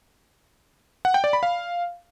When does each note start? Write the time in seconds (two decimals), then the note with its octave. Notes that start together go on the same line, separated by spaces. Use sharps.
1.05 F#5
1.14 G5
1.24 D5
1.33 B5
1.43 F5